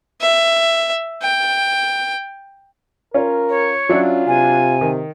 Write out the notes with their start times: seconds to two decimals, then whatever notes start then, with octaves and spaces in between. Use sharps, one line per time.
0.21 E5
1.23 G5
3.14 C#4 F4 A#4
3.49 C#5
3.89 F#3 C#4 D4 F4 E5
4.27 C3 G#5
4.81 D#3